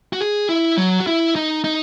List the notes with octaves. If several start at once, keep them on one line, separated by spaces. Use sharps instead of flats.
F#4
G#4
E4
F#3
F#4
E4
D#4
D#4